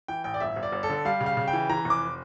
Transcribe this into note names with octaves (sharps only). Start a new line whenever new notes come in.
E3 G5
A1 G5
D5
G1 E5
G1
D5
G1
A4
D3
G3 F5
C#3
F5
C#3
G5
E3
E3 A#5
F1 D6